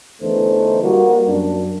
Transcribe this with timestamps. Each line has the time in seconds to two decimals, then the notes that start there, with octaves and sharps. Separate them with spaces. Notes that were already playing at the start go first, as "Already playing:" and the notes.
0.22 E2 D3 E3 A3 D#4 C5
0.82 G3 A#3 F#4
1.28 F#2 D4